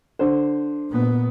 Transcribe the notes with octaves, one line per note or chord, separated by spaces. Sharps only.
D3 C5
A#2 B3